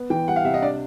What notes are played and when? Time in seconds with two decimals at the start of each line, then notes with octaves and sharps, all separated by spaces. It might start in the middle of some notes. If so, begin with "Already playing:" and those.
Already playing: B3
0.10 E3 G5
0.28 G3 F#5
0.36 F5
0.44 C3 E5
0.54 D#5
0.62 D4 D5